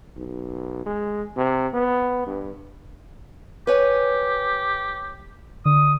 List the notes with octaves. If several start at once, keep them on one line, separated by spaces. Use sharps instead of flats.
B1
G#3
C3
B3
G2
G4 B4 C#5 G#5
D3 D#6